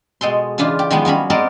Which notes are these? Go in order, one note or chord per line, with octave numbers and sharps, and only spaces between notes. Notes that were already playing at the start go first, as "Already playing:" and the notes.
B2 G#3 A4 C6
C#3 E3 D4 F4
G4
D#3 F3 G#3 B3
F#3 G3 C#4 B5
G#3 B3 C4 A#4 C5 D5